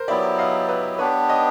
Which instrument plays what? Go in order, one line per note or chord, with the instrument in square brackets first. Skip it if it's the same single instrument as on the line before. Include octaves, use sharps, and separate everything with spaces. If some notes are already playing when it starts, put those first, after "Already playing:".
Already playing: [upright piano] A#4 C5
[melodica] F#3 B3 E4 G4 [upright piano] D5 E5
[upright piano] D#5 F5
B4
[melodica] B3 D4 G4 [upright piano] B4 C#5
[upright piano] C#5 D#5